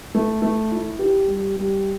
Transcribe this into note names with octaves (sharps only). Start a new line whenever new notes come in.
A3
A3
E4
G4
G3
G3